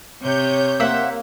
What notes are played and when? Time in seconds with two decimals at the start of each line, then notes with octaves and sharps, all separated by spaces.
0.22 C3 C#5 G6
0.80 A#3 C5 E5 F#5